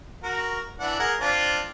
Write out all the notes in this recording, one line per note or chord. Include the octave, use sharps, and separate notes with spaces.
F#4 A#4
E3 D4 F#5
G#4 A#4 F#5
C4 D4 F4